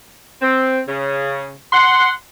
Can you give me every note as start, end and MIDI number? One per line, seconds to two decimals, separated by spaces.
0.42 0.80 60
0.88 1.53 49
1.73 2.11 78
1.73 2.11 84